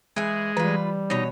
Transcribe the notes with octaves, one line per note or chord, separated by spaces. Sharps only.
E3 G#3 G#4
E3 G3 F4 B4
B2 D#4 C#5